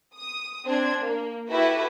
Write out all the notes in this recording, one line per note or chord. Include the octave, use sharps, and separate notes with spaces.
D#6
C4 D4 G#6
A#3
E4 F#4 G4 A4 B4 E5